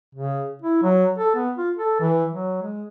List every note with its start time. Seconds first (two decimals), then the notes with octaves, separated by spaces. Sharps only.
0.15 C#3
0.62 E4
0.83 F#3
1.18 A4
1.35 B3
1.58 F4
1.77 A4
2.00 E3
2.33 F#3
2.63 G#3